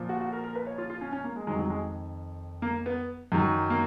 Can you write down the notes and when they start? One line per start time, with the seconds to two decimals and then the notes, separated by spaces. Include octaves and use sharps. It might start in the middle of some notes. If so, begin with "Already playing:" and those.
Already playing: A#2 F3
0.09 F#4
0.21 F#4
0.33 A#4
0.44 A#4
0.55 B4
0.67 C#5
0.78 F4
0.90 F4
1.01 C#4
1.13 C#4
1.24 A#3
1.36 G#3
1.47 F2 D#3 F#3 G#3
1.59 F#3
1.70 G#3
2.62 A#3
2.86 B3
3.32 F#2 D#3 F#3
3.70 A#3